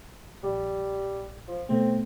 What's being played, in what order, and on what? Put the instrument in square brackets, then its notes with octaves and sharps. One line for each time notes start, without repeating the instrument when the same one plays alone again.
[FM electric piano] A#1 [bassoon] G3
[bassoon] F3
[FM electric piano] B2 A3 [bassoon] C4